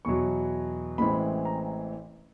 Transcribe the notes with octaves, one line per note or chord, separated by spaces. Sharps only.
E2 B2 F#3 C#6
A1 A2 E3 G#3 C4 B5
A#5